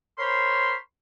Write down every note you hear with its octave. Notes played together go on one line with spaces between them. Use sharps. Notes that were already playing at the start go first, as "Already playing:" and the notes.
A#4 C5 C#5 B5 C6